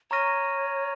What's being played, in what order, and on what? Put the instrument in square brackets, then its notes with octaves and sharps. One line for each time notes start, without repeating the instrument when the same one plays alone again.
[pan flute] C#5 [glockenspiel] A#5 C#6 F6 A#6 D#7